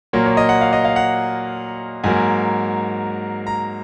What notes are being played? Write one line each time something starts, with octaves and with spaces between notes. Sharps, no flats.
A#2 F#3 A#3 C#5
C#5
D#5
F#5
F5
D#5
F5
F#5
G#2 F#3 A#3 G#5
A#5